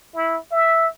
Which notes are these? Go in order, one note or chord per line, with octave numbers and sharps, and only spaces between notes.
E4
E5